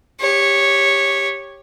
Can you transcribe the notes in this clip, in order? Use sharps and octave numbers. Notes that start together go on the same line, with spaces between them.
G4 C#5